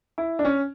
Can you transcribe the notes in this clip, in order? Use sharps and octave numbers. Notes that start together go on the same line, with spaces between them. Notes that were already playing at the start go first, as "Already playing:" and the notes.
E4
D4
C#4